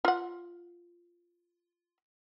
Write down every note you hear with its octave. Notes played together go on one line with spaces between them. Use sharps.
F4 F#5